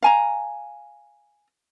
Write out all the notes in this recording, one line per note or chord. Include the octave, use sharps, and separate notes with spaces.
F5 G#5 A#5